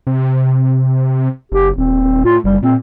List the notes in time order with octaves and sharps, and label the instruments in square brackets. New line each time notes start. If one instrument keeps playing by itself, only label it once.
[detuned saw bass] C3
[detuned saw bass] F#1 [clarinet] G4
[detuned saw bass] D#1 [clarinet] C4
[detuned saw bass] A2 [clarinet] F4
[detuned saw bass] F#1 [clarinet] G3
[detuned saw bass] A#2 [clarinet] C4